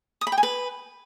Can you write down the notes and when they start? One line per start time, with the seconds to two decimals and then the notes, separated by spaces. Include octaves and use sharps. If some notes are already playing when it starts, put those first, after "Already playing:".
0.21 D#6
0.27 B5
0.32 G5
0.38 G#5
0.43 B4